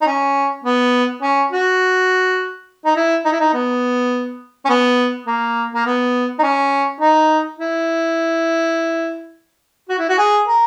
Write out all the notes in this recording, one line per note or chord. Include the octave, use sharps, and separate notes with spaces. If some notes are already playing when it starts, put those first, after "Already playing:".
D#4
C#4
B3
C#4
F#4
D#4
E4
D#4
E4
D#4
B3
C#4
B3
A#3
A#3
B3
D#4
C#4
D#4
E4
F#4
E4
F#4
G#4
A#4